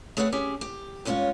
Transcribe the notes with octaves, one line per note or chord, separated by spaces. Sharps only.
A3 G#4 B4 C#5 F5 F#5
C#4 G4 G#4
G4
G2 G#3 C#4 E4 F4 C#5